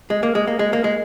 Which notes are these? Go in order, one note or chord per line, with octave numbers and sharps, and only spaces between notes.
G#3
A#3
G#3
A#3
G#3
A#3
G#3